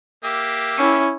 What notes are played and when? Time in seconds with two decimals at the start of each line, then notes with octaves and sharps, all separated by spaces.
0.24 A#3 G4 E5
0.78 C#4 E4